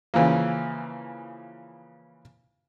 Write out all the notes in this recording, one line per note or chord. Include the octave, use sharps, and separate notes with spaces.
C#3 E3 F3 A#3